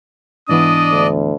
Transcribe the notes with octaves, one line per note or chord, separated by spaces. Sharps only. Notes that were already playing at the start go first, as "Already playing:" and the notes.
G#2 E3 B3 D4 D5 D#5 D#6
D2